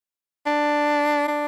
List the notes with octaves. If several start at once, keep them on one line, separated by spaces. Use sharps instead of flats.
D4
D4